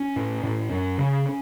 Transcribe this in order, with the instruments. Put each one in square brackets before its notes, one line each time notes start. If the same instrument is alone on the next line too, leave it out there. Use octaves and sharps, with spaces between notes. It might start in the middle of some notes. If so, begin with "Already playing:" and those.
Already playing: [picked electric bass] C#4
A2
A2
F#2
C#3